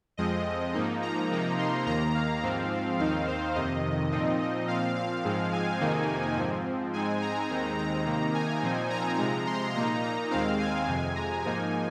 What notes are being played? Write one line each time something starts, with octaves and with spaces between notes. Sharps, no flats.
F2 F3 G#3 C4 D#5
G#2 F3 A#3 D#4
A#5
C3 F3 A#3 D#4
C6
D#2 D#3 A#3 A#5
F5
G#2 F3 C4
D#2 D#3 C4 D#4 F5
C5
F2 C3 D#3 D#5
A#2 F3 C4 D#4 D#5
D#5
A#2 F3 C4 F5
F5
G#2 F3 G#3 C4
G#5
F2 C3 D#3 A#3 D#4
G#2 F3 C4
G#2 G#3 C4 D#4 G#5
A#5
D#2 D#3 G#3 C4 D#4
A#5
C3 D#3 A#3 D#4
G#5
A#2 F3 C4 D#4
A#5
C3 F3 G#3
C6
A#2 A#3 D#4 A#5
A#5
D#2 D#3 G#3 C4 F5
G#5
F2 C3 G#3
A#5
G#2 F3 A#3 D#4 G#5